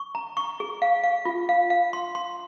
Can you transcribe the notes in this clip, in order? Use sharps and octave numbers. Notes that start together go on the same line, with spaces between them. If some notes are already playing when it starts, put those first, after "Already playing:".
Already playing: C#6
A#5
C#6
G#4
F5
F5
F4
F5
F5
C6
C6